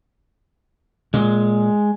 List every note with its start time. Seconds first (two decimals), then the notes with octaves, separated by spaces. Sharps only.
1.14 A#2 G#3